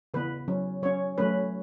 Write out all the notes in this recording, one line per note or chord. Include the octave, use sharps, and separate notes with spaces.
C#3 E3 B3 B4
F#3 C#4
F#3 C#4 C#5
F#3 A3 C#4 B4